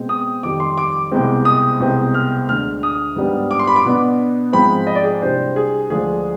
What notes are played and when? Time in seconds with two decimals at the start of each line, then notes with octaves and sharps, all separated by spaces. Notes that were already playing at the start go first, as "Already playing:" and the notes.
Already playing: B2 G#3 C4
0.09 D#6
0.43 F2 D#3 G3 D6
0.60 C6
0.78 D6
1.11 C2 B2 G#3 C4
1.45 D#6
1.80 C2 B2 G#3 C4
2.14 F6
2.48 D2 D3 G#3 D4 F6
2.83 D#6
3.16 G#2 G3 B3 D4
3.51 D6
3.59 C6
3.67 B5
3.76 D6
3.85 B2 B3 D4
4.53 G#2 F3 G#3 C4 B5
4.87 D#5
4.95 D5
5.04 G#4
5.22 C2 C3 G3 D4 C5
5.56 G#4
5.90 D2 D3 F3 G#3 D4 G#4